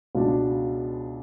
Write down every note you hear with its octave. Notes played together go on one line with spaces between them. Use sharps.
C#2 B2 G#3 D4